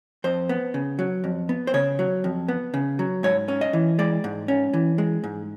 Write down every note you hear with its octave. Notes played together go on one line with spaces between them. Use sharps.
F2 C5
B3
C#3
F#3
F2
B3
C5
C#3 C#5
F#3
F2
B3
C#3
F#3
G#2 C#5
C#4
D#5
E3
G#3 D5
G#2
C#4
E3
G#3
G#2